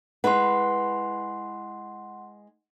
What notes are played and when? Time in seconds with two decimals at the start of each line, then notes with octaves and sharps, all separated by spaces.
0.24 G#3 E4 B4 F#5 C6